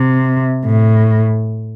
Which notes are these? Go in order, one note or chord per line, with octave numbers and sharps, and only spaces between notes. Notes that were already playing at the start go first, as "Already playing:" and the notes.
Already playing: C3
A2